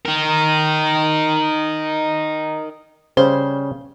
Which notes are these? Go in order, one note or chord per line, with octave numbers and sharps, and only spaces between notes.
D#4 A#4
C#3 G3 C#4 C5